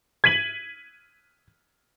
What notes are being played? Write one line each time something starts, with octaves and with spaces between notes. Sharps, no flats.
G#6 B6 D#7 F#7